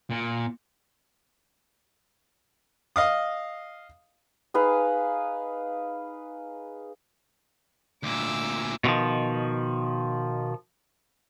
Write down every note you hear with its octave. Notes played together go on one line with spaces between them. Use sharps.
A#2
D#5 F5 D#6
D#4 G#4 B4 F5
D2 A#2 D6 E6
B2 D3 D#3 F3